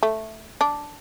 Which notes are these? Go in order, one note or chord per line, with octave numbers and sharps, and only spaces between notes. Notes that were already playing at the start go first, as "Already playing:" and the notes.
A3
D4